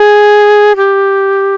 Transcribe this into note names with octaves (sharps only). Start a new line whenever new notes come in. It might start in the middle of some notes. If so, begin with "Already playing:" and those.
Already playing: G#4
G4